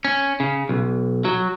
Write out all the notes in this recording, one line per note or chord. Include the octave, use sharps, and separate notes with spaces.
C#4
C#3
B1
F#3